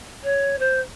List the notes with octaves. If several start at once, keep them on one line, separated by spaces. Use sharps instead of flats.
C#5
C5